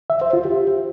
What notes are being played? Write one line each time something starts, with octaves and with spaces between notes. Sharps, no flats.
E5
C5
F4
G4